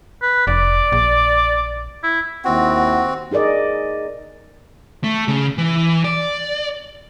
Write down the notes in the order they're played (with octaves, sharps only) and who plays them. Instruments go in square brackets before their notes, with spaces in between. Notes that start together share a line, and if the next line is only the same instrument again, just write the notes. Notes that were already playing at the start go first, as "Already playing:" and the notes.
[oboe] B4
[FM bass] F1 [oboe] D5
[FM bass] A#1
[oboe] E4
[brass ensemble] D#2 E4 F#5 [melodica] C4 F#4
[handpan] D#4 G#4 A#4 D5 D#5
[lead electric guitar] A3
C#3
E3
D5